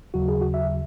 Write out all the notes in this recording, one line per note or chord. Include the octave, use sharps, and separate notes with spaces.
D#2 C#3 F#3 F#4
G#4
F#4
E5